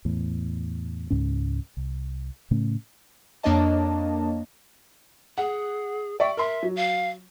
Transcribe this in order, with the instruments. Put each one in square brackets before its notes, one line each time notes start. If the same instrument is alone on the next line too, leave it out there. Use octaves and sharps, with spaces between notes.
[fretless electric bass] E2 A2
C#2 G#2 C#4
C2
A2 C#3 A3 C#4
[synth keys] F2 A#3 D4 C#5 D#5 A5
[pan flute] G#4 [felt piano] F#5
[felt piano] D5 E5 C#6 [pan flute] G5
[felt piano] A#4 C6 [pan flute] E5
[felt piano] F#3
[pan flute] F5